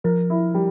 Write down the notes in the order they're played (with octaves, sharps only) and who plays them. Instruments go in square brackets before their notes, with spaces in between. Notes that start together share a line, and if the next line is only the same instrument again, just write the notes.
[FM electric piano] F3 [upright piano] A#4
[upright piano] E4
G3